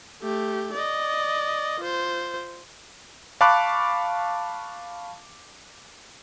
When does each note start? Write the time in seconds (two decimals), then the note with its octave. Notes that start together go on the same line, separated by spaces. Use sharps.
0.22 A3 G4
0.73 D5 D#5
1.80 F4 C5
3.41 F5 A5 B5 C#6 D6 F#6